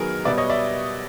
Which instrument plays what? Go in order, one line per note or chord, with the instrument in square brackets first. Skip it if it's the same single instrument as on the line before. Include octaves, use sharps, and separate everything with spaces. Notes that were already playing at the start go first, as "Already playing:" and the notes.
Already playing: [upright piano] D#3 F#3 B3 G#4 A#4
B2 G3 B3 D5 E5
C#5 D#5
D5 E5